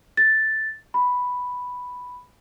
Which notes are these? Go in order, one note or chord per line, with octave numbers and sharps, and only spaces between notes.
A6
B5